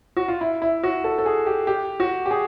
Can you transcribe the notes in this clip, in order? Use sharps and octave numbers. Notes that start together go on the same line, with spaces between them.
F#4
F4
E4
E4
F#4
A4
A4
G#4
G4
G4
F#4
G4
G#4